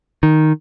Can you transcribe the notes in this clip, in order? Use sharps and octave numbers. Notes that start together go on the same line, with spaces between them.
D#3